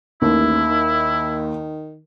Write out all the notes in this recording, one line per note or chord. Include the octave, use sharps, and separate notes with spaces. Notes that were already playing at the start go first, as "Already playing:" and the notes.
A1 D#2 E4
D#3